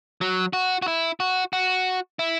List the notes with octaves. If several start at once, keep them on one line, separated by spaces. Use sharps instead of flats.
F#3
F#4
F#4
E4
F#4
F#4
E4